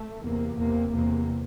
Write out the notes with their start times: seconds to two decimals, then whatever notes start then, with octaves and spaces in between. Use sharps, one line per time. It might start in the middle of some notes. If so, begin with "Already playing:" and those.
Already playing: A3
0.23 E2 C3 A#3
0.58 E2 C3 A#3
0.93 E2 C3 A#3